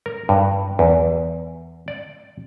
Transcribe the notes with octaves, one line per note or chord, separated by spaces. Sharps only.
A#4
G2
E2
D5